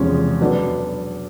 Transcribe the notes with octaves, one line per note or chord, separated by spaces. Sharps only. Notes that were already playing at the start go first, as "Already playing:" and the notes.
Already playing: E2 C3 F3 G#3 C#4
F#3 B3 D4